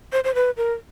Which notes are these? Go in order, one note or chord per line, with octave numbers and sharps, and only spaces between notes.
C5
C5
B4
A#4